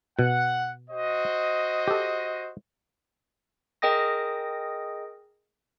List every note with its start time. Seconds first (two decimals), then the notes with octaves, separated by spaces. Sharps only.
0.19 B2 F#5
0.90 F#4 C5 D#5
1.88 G4 A4
3.82 G#4 A#4 D#5 G5 D#6 A#6